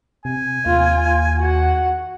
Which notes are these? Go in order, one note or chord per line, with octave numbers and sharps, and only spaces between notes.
C3 G#5
D#2 F4
F#4 F#5